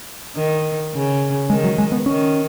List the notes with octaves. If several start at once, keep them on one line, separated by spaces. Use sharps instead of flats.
D#3
C#3
D#3 G#3
F#3
G#3
B3
D#3 C#4